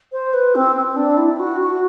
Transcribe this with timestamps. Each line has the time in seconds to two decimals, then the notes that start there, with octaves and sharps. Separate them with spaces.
0.12 C5
0.33 B4
0.55 C4
0.76 C4
0.96 D4
1.17 E4
1.39 F#4
1.60 F#4